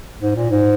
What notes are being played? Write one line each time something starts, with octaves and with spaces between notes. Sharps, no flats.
G#2
A#2
G#2